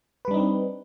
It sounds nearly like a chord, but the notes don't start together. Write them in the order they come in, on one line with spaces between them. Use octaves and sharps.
B4 G3 D4 D#4 C4